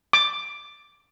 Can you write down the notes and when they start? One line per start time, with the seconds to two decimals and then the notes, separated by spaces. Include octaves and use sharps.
0.13 D6